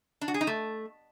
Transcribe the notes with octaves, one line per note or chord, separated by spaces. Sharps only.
D4
F#4
G#4
D#4
A3